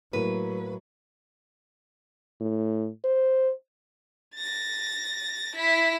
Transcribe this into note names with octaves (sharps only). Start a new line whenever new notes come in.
A2 F#3 A#3 B4
A2
C5
A6 A#6
E4 B6